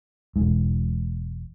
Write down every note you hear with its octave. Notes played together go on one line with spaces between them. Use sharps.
E1 G#2